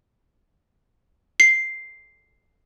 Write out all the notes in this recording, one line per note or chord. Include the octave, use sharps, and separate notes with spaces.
C7